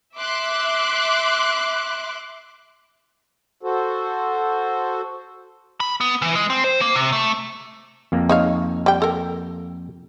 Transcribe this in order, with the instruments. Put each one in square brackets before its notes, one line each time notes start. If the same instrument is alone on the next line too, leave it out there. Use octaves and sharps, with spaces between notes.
[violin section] E5 C6 D6 F#6
[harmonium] F#4 A4 C5
[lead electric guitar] B5
B3
E3
G#3
C4
C5
A#3
C3
A3
[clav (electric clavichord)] F2 A#3
[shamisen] D#4 C#5 F5
G3 G5
A4 A#4